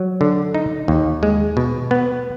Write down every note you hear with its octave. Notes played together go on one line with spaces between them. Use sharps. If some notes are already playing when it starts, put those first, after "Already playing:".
Already playing: F#3
D3
D#4
D#2
G#3
B2
B3